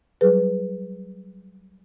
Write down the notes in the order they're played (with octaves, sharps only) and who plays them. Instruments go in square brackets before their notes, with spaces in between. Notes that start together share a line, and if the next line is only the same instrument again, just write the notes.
[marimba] F#3 G3 G#4 B4